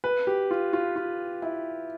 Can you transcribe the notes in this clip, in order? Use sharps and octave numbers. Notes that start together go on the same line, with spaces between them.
B4
G4
F4
F4
F4
E4